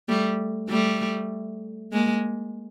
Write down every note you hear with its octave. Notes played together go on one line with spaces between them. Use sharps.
G3 A3
G3 A3
G#3 A#3